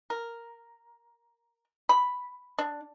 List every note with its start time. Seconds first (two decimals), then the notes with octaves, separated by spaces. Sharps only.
0.10 A#4
1.89 B5
2.58 D4